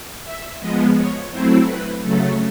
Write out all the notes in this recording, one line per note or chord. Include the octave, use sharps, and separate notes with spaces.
E5
F3 G#3 B3 D#5
C#5
F#3 A3 C4 E4 C5
B4
C#3 F#3 A3 A4